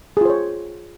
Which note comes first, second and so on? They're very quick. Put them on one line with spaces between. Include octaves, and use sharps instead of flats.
G#4 F4 C5 C#5